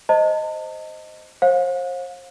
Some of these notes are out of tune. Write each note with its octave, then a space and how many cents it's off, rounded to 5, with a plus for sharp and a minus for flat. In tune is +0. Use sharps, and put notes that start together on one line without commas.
C5 +0 D#5 +0 A5 +40
C5 +40 F5 +35